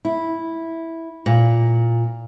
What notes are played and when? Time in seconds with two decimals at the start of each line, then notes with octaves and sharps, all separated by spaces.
0.05 E4
1.26 A#2